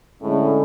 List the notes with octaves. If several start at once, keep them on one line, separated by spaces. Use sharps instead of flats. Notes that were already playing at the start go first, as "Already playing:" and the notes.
A2 D3 G#3 C#4